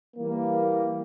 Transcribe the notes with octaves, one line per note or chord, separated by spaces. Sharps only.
E3 G3 A#3